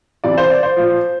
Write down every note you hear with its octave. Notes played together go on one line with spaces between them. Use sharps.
C3 E3 D5
C5
D5
C5
A#2 F3